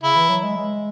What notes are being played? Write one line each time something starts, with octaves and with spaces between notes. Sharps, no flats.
C#3 E4
E3
F#3
G#3
G#3